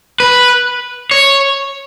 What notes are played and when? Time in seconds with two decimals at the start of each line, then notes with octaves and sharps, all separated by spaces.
0.20 B4
1.11 C#5